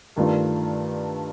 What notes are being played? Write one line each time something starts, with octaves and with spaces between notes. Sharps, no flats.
G2 D#3 A3 D4 F4